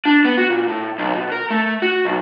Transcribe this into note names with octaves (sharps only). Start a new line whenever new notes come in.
D4
B3
F#4
A#2
A2
B1
B2
A#4
A3
F#4
B1